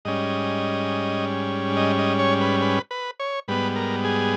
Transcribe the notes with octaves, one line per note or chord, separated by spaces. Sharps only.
G#2 G3 C#4 D#5
D#5
D#5
C#5
B4
B4
B4
C#5
G#2 G3 B3 B4
A#4
G#4